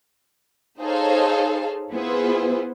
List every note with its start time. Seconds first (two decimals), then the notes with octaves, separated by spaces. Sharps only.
0.81 D#4 G#4 A4 C5 C#5 F5
1.92 B3 E4 F4 G#4 B4 C5